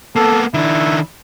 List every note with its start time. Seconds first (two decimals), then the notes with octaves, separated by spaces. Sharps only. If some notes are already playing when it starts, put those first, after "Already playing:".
0.16 A#3 B3 A4
0.54 D#3 D4 E4